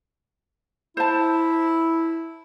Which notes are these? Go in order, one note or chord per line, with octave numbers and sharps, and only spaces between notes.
E4 C5 A5